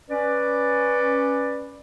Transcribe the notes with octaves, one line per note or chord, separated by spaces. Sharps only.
C#4 B4 D5